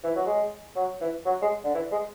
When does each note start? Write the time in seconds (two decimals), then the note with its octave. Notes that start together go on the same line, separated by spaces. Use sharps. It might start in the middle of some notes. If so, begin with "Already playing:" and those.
0.04 E3
0.16 F#3
0.26 G#3
0.76 F#3
1.01 E3
1.26 F#3
1.42 G#3
1.64 D3
1.75 E3
1.92 G#3